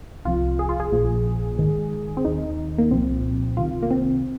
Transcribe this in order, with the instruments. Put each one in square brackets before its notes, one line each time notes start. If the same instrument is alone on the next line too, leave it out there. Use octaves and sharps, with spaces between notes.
[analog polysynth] C2 C3 F3 F4
G#4
F4
G#4
A#1 A#2 F3
G#1 G#2 D#3
C4
D#2 D#3 D#4
A#3
C2 A#2 F3 C4
C2 C3 D#3 F4
A#3
C4